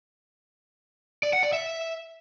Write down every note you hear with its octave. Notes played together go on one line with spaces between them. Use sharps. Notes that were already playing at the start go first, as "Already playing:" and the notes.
D5
F#5
D5
E5